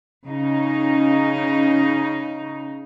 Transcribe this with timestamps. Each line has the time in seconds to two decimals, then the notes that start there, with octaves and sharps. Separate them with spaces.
0.24 C#3 D#4